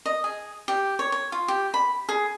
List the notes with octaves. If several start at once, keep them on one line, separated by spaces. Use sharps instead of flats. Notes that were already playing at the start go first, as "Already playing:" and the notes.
D#5
G#4
G4
C#5
C#5
F4
G4
B5
G#4